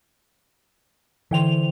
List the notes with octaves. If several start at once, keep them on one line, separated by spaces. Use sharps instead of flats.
D3 E3 C5 G5 F7